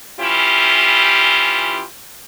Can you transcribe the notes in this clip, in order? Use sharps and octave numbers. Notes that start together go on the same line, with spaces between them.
E3 C#4 E4 F4 G4